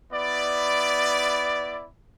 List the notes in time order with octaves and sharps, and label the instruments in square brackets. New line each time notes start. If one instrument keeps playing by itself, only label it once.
[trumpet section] B3 E4 D5